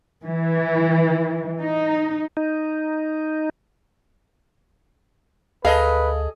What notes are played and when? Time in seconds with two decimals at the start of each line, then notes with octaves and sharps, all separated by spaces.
0.24 E3
1.60 D#4
2.37 D#4
5.65 D2 G#4 A4 B4 D#5 F5